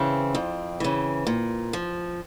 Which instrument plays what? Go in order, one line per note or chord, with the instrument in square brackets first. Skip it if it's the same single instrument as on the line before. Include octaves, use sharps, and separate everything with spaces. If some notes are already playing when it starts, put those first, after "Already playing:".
Already playing: [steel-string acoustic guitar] C#3 E3 C4
F2
C#3 E3
A#2
F3